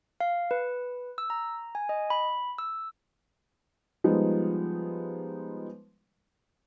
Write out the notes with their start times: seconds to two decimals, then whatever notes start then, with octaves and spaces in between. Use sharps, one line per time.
0.20 F5
0.51 B4
1.18 E6
1.30 A#5
1.75 G#5
1.89 D#5
2.10 B5
2.58 E6
4.04 F3 G3 G#3 B3 D#4